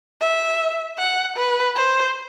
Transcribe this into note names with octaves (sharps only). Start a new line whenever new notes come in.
E5
F#5
B4
C5